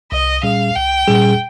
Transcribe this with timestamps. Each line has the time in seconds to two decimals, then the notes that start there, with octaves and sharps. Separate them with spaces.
0.12 C2 D#5
0.43 A#2 G3 C#4 G#4 F5
0.75 C2 G5
1.08 A#2 G3 C#4 G#4